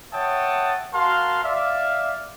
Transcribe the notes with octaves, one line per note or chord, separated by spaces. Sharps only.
C#5 E5 F#5 G5 A5 D#6
F#4 A#4 F5 A5 C6
D5 E5 F5